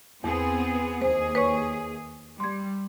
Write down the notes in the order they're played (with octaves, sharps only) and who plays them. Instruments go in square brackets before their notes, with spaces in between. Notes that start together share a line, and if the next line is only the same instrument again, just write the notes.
[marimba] E2 [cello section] B3 C4 G#4
[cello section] D#2 G#4 [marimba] C5
[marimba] B4 C#5 C#6
[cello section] G3 [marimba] C6 G#6